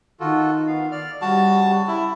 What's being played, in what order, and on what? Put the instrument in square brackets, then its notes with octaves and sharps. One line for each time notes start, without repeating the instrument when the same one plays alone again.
[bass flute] D#3 [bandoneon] F4 F#4 A4
[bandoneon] B3 F5
D5 F6
[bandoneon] C#3 [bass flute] G3 [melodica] F#4 A5
[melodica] E4